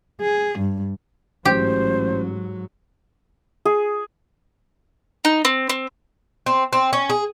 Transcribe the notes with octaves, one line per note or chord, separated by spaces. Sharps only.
G#4
G2
A1 G#2 F#3 G4 C5
G#4
D#4
C4
C4
C4
C4
C#4
G#4